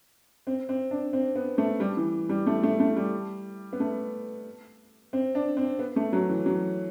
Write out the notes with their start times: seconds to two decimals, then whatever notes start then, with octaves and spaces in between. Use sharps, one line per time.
0.47 C4
0.69 C4
0.91 D4
1.13 C4
1.36 B3
1.58 A3
1.80 G3
1.97 E3
2.29 G3
2.47 A3
2.63 A3
2.80 A3
2.96 G3
3.73 B3
3.80 A3
5.13 C4
5.35 D4
5.57 C4
5.79 B3
5.96 A3
6.13 F#3
6.29 E3
6.46 F#3